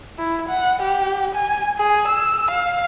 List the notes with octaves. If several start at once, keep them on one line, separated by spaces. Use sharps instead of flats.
E4
F#5
G4
G#5
G#4
E6
F5